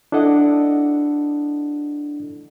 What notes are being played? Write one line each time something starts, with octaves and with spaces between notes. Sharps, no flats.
D4 E4 A4 D#5 F#5